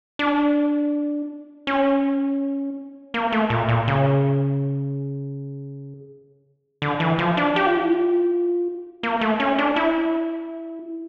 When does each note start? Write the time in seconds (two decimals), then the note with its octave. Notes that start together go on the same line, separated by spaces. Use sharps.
0.19 D4
1.67 C#4
3.14 A#3
3.32 A3
3.50 A#2
3.69 A#2
3.88 C#3
6.82 D3
7.00 E3
7.19 F3
7.37 D4
7.56 G4
7.66 F4
7.77 E4
7.88 F4
9.03 A#3
9.21 A3
9.40 C#4
9.58 D4
9.76 E4